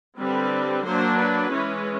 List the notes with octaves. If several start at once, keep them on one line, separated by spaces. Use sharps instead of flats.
D3 G3 C4 B4
F#3 A#3 D4 C5
B4
E3 G#3 C#4